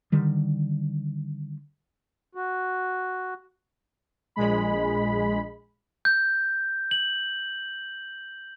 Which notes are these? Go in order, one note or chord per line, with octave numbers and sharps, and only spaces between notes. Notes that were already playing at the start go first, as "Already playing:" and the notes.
D3 D#3 G3
F#4
A#1 G#3 B5
G6
F#7